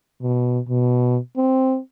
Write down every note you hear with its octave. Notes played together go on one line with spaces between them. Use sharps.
B2
B2
C4